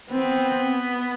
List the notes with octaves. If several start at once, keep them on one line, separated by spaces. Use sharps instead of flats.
B3 C4